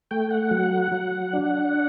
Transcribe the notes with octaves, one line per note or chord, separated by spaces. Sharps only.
A3 G5
F#5
F#3
F#3
D4